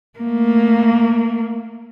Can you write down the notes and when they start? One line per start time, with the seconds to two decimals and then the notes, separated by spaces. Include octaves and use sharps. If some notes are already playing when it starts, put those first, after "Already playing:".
0.19 A3 A#3